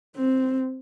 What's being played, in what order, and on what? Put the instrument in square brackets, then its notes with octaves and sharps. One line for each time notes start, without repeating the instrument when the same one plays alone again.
[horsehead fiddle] C4